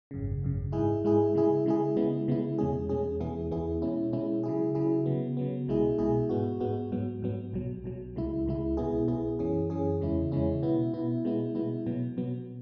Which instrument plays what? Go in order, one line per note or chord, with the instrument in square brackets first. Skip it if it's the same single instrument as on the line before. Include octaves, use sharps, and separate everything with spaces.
[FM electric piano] G#1 F#2 C#3
G#1 F#2 C#3
G#2 G#3 E4 G#4
G#2 G#3 E4 G#4
C#3 G#3 E4 G#4
C#3 G#3 E4 G#4
C#3 G#3 B3 E4
C#3 G#3 B3 E4
E2 B2 G#3 C#4 G#4
E2 B2 G#3 C#4 G#4
E2 E3 B3 E4 G#4
E2 E3 B3 E4 G#4
B2 G#3 C#4 E4
B2 G#3 C#4 E4
C#3 F#3 E4 G#4
C#3 F#3 E4 G#4
C#3 F#3 B3
C#3 F#3 B3
B1 B2 G#3 E4 G#4
B1 B2 G#3 E4 G#4
G#2 G#3 B3 F#4
G#2 G#3 B3 F#4
G#2 F#3 B3
G#2 F#3 B3
B1 B2 F#3
B1 B2 F#3
C#2 C#3 G#3 E4
C#2 C#3 G#3 E4
B1 B2 B3 E4 G#4
B1 B2 B3 E4 G#4
F#2 E3 C#4 G#4
F#2 E3 C#4 G#4
E2 C#3 G#3 C#4 E4
E2 C#3 G#3 C#4 E4
B2 B3 E4
B2 B3 E4
B2 G#3 B3 E4
B2 G#3 B3 E4
B2 F#3 B3
B2 F#3 B3